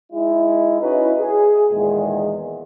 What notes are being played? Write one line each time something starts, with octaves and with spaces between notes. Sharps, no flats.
G#3 D#4 E4
C#4 D#4 E4 F#4 B4
G#4
E2 A#2 D#3 G#3